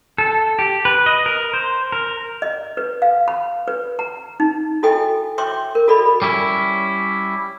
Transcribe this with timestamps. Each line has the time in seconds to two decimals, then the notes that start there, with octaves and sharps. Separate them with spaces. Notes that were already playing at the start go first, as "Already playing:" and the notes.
0.18 A4
0.59 G4
0.85 B4
1.06 D#5
1.26 A#4
1.54 C5
1.92 A#4
2.42 D#5
2.77 B4
3.02 F5
3.28 B5
3.68 B4
3.99 A#5
4.40 D#4
4.83 E4 F#4 A4 D#5 G5 G#5
5.38 C#5 E5 G5 C6 D6
5.75 A#4
5.88 F#4 A4 D5 D#5 B5
6.22 G3 C#4 E4